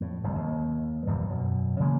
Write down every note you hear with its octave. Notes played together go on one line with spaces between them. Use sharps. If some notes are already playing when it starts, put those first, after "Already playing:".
F2 A2
G1 C2
D#2
D#1 G#1 E2 G2
F#2 B2
C#3 E3 G#3 A#3